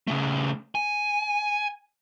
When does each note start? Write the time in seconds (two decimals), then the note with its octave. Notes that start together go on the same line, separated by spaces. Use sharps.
0.07 C#3 A3
0.75 G#5